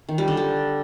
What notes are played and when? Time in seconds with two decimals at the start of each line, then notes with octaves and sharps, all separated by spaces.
0.09 D#3
0.18 G3
0.28 D3
0.37 G3